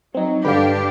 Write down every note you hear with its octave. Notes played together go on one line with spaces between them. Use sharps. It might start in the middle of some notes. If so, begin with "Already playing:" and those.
F#3 C4 D#4
G2 D3 D4 G4 B4 F5